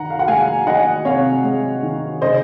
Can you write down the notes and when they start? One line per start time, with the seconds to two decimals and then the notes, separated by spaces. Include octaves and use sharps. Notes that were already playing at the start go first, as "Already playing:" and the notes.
Already playing: D#3 F#5 A#5
0.10 F5
0.19 F#5
0.28 G#3 F5 G#5
0.66 D#3 D#5 F#5
1.05 C3 C#5 F5
1.44 G#3
1.83 D#3
2.22 C#3 C5 D#5